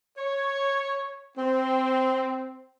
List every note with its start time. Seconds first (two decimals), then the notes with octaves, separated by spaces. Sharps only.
0.18 C#5
1.38 C4